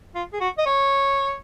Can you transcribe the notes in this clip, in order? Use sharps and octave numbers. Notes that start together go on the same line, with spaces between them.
F4
G#4
F#4
D#5
C#5